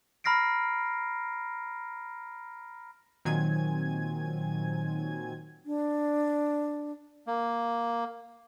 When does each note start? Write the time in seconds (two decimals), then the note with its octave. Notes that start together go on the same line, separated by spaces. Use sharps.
0.24 A#5 B5 F6 A#6 C7 D7
3.25 A#2 D#3 F#3 C4 G#5 G#6
5.66 D4
7.27 A#3